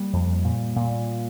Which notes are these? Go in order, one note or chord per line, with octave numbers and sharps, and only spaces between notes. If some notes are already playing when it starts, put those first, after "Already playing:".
Already playing: G3 A#3
F2
A#2
A#2